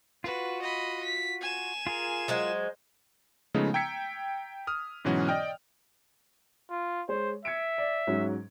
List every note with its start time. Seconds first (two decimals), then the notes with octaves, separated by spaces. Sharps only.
0.24 F4 F#4 B4
0.62 D#5 B5
1.03 B6
1.41 G#5 E7
1.87 F4 G#4 A#4
2.28 F#3 G#3 C5
3.54 C#3 F3 G#3 A3 B3 D#4
3.74 G5 A#5 E6 G#6 B6 C#7
4.67 D#6 F6
5.05 G#2 B2 E3 F#3 C#4 F#4
5.28 D5 D#5 G5 F6
6.70 F4
7.09 G#3 C5 C#5
7.45 E5 G#6 C#7 D7
7.78 D5
8.07 G#2 F#3 C#4